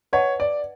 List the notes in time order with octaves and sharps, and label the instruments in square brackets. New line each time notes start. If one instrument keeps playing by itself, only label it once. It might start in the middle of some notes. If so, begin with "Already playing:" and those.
[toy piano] B4 D#5 F#5 A5 [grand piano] C#5
[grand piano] D5